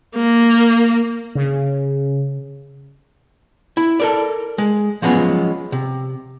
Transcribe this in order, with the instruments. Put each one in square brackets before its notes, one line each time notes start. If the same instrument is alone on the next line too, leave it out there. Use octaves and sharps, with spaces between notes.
[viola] A#3
[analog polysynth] C#3
[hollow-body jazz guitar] E4
A4 A#4 D5
G#3
F3 F#3 G#3 B3 C#4 F4
C3